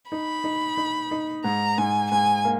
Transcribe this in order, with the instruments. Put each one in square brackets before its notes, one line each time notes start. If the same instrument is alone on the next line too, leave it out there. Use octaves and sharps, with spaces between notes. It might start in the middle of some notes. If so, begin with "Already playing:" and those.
[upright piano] D#4 [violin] B5
[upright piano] D#4
D#4
D#4
[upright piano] G#2 [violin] A#5
[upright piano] G#2 [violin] G#5
[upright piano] G#2 [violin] G#5
[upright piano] A#3